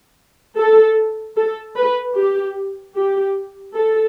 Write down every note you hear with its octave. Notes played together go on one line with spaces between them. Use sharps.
A4
A4
B4
G4
G4
A4